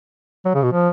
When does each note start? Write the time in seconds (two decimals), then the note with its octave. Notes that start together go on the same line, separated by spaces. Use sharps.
0.45 F#3
0.55 C#3
0.63 B2
0.72 F3